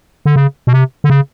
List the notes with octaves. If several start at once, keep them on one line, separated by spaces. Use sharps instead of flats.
D3
C#3
B2
C3
D3
C#3